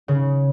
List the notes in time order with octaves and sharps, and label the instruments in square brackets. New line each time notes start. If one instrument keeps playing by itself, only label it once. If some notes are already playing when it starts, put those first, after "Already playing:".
[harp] C#3